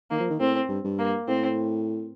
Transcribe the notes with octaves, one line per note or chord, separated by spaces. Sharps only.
D#3 A#3
F3
D#3
A2 C4
G2
G2
A#3
A2 C4